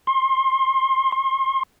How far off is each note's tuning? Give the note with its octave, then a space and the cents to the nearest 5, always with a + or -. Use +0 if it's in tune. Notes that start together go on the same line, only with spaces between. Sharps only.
C6 +30
C6 +40